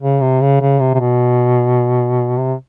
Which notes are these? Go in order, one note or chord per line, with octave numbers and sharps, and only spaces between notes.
C#3
C3
C#3
C#3
C3
C3
B2
C3